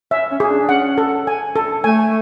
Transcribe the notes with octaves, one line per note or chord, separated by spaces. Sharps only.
C#4 E5
C#4
G#4
D4
D4
C#4 F#5
A4
G#5
A4
A3 G#5